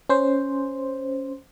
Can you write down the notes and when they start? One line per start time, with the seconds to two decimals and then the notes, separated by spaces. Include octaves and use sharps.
0.09 C#4 C5